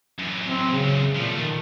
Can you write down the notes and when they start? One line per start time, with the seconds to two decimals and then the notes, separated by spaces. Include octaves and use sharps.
0.19 F#2 E3
0.47 C4
0.71 C#3
1.16 A#2 F3 A3
1.37 D#3